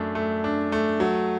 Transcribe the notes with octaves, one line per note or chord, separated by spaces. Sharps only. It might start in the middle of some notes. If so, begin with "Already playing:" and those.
Already playing: F#2 A3 D4
A3
D4
A3
F#3